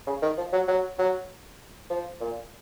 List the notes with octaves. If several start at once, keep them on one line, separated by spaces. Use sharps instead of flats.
C#3
D#3
F3
F#3
F#3
F#3
F3
A#2